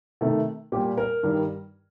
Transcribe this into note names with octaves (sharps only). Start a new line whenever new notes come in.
C3 D#3 A3
A#2 G3 G4
A#4
G2 D#3 G3